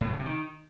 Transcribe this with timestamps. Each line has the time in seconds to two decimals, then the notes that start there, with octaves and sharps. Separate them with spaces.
0.01 A2
0.07 F#3
0.13 C#3
0.19 C3
0.26 D#3